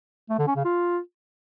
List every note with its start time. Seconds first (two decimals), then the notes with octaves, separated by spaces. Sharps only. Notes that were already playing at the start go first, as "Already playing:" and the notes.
0.30 A3
0.38 D3
0.47 C#4
0.56 C#3
0.65 F4